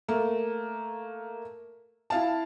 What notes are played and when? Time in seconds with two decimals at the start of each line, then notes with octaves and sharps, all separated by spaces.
0.08 A3 A#3
2.10 E4 F5 A5